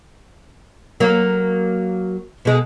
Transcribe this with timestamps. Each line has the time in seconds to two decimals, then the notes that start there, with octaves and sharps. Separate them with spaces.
1.00 F#3 A#3
2.45 B2 G#3